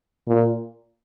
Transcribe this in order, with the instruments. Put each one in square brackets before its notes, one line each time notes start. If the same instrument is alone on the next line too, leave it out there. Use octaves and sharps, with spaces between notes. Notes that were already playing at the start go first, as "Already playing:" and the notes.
[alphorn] A#2